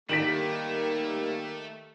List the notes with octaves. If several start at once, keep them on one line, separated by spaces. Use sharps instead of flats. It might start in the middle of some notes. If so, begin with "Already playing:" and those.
D#3 G3 A3 A#3 G4 B6 D7 F#7